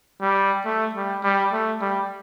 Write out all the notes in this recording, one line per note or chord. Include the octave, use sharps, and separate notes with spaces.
G3
A3
G3
G3
A3
G3